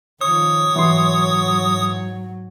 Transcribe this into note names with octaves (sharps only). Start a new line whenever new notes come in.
D#3 F3 C#5 D#6
G#2 E3 F#3 C6